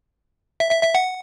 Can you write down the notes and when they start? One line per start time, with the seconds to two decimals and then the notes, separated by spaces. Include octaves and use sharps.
0.60 E5
0.71 E5
0.83 E5
0.95 F#5